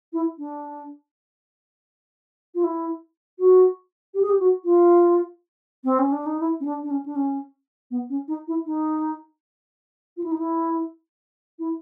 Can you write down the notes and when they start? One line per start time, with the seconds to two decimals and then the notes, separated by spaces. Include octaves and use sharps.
0.13 E4
0.38 D4
2.55 F4
2.64 E4
3.39 F#4
4.14 G4
4.22 G#4
4.30 G4
4.39 F#4
4.65 F4
5.84 C4
5.99 C#4
6.12 D4
6.26 D#4
6.40 E4
6.60 C#4
6.65 D4
6.83 D4
6.91 C#4
7.06 D4
7.16 C#4
7.91 B3
8.10 C#4
8.28 D#4
8.48 E4
8.66 D#4
10.17 F4
10.23 E4
10.32 D#4
10.38 E4
11.59 E4